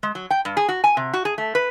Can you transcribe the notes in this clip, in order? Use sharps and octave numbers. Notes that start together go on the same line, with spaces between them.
G#3
F#3
G5
G2
G#4
F#4
G#5
C3
F#4
G#4
A3
B4